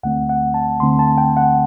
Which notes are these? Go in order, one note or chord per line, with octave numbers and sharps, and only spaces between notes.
D2 D3 A3 C4 F#5
F#5
A5
D2 D3 A3 C4 C6
A5
G5
F#5